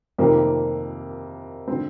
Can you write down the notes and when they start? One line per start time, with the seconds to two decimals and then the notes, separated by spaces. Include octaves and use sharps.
0.18 F2 C3 D#3 A#3
1.68 D3 C4